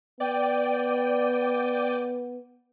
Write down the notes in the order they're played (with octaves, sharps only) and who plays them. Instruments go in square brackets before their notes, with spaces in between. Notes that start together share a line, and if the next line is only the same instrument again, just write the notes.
[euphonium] B3 [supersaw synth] D5 G5 D#7